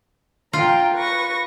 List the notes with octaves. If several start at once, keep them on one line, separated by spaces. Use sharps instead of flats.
F4 G5 A#5
B4 C#6 A#6